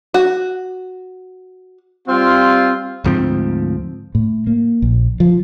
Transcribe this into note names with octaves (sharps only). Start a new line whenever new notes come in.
F#4
G3 C4 F4
D2 G#2 F3 C4
A2
A#3
A#1
F3